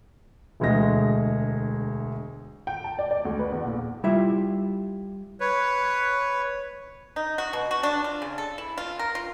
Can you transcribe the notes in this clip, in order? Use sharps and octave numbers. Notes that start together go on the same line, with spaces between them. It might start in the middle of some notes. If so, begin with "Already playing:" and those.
E1 D2 G#3 A#6
G5
A5
D5
D5
D2
B4
E2
A#1
G3 E4 F4 E5
B4 C#5
D#4
F#4
B2
F#4
D4
F4
C#3
A4
E4
F4
A#4
F4